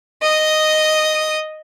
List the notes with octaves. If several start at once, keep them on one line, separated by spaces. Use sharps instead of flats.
D#5 D#6